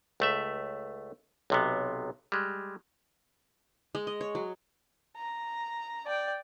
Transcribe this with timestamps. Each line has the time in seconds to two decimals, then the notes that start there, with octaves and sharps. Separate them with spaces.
0.20 C#2 A3 E5
1.50 B1 C3 B3
2.32 G3 G#3
3.95 G#3
4.07 D#5
4.21 C#5
4.35 F#3
5.17 A#5
6.06 D5 G5